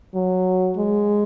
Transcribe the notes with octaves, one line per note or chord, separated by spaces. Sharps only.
F#3
G#3